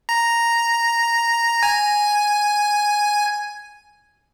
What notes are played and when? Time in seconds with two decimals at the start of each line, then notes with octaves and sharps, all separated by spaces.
0.09 A#5
1.63 G#5